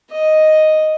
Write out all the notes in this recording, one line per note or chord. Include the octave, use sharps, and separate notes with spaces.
D#5